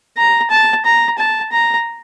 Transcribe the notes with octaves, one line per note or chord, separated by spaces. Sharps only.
A#5
A5
A#5
A5
A#5